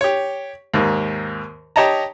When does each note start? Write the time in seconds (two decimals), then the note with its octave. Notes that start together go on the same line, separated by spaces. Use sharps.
0.01 G4 C#5
0.74 D#2 G#2 A#3
1.76 G4 C#5 D#5 A5 A#5